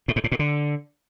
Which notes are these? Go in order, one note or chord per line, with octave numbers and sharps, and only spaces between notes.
A2
G#2
A2
A#2
D3